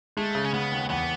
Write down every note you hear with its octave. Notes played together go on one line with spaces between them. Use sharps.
G#3 A3
C#3
C#4
G#3 B3
D#2
E2 B3